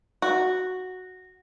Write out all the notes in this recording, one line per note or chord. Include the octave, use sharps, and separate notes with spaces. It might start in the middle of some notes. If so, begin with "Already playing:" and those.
F#4